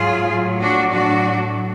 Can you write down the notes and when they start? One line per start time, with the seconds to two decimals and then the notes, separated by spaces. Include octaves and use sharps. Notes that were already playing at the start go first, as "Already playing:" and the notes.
Already playing: G#2 F#3 F4 G#4
0.30 A2 F#3
0.61 D4 F#4
0.91 A2 F#3 D4 F#4